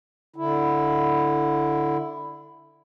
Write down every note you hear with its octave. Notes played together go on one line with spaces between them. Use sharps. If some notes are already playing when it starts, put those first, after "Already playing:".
D3 E4